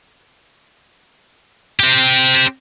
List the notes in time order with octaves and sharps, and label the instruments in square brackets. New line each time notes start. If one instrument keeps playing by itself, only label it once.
[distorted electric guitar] C4 G4